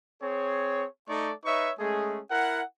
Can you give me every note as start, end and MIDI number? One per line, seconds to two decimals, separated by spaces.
0.22 0.85 60
0.22 0.85 68
0.22 0.85 73
1.09 1.32 57
1.09 1.32 63
1.09 1.32 69
1.09 1.32 74
1.09 1.32 85
1.45 1.71 63
1.45 1.71 71
1.45 1.71 73
1.45 1.71 76
1.45 1.71 85
1.80 2.20 56
1.80 2.20 57
1.80 2.20 61
1.80 2.20 68
2.31 2.62 64
2.31 2.62 70
2.31 2.62 78